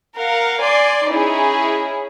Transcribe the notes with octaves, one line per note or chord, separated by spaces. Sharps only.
A#4 F5 F#5
D5 G#5 C6
C#4 D#4 E4 G#4